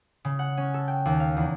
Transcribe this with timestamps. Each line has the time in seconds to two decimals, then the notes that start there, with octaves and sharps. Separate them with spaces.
0.25 C#3
0.39 F#5
0.57 C#4
0.74 A4
0.88 G5
1.05 D#2
1.20 F5
1.37 E2